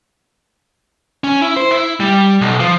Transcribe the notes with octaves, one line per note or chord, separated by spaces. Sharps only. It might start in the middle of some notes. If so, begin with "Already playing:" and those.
C#4
E4
C5
E4
G3
B1
F3